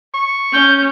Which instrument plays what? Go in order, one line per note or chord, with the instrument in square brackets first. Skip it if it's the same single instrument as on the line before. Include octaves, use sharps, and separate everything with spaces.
[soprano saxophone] C#6
[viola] C#4 [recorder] G6